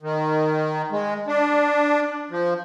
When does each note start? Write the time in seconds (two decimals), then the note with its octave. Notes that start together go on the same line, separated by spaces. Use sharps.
0.03 D#3
0.92 G#3
1.28 D4
2.31 F3